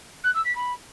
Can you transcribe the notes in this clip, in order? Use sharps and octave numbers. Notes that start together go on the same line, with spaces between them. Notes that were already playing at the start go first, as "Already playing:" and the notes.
F#6
E6
B6
B5